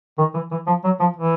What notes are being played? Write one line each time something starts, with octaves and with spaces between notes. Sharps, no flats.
D#3
E3
E3
F3
F#3
F3
E3